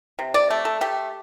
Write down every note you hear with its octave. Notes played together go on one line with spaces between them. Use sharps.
C3
D5
A3
A4
A3 G4